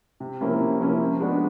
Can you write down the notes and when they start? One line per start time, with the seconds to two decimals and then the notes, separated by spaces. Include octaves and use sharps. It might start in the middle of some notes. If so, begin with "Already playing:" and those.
0.20 C3
0.41 F3 A#3 C#4 E4
0.61 C3
0.80 F3 A#3 C#4 E4
1.00 F3
1.20 G#3 B3 D4 F#4